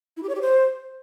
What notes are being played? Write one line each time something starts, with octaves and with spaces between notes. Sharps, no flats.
E4
G4
C#5
G4
C5